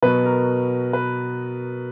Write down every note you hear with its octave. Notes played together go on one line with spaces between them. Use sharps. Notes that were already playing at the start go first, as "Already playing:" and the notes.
B2 F#3 B3 B4
A#4
B4